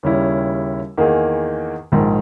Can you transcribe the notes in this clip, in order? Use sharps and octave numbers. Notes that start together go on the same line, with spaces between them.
D#2 C#3 G3 C#4 E4
E2 D#3 A#3 D#4 G#4
A#1 G#2 D#3